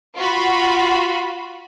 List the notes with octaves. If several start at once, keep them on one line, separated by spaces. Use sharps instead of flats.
F4 F#4 B5